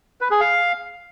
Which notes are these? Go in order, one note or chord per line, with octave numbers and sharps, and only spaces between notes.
B4
G#4
F5